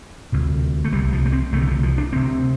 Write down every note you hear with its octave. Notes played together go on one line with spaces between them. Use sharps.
D2 C3
A3
C2 C3 G3
F3
A3
C4
C2 C3 A3
D3
F3
F3
D4
D2 C3 C4